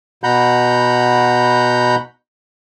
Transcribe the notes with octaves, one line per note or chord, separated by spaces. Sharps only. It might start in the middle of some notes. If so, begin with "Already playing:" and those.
B2 F#5 A#5 B5 G6